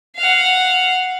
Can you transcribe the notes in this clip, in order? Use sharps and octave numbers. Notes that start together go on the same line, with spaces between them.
F5 F#5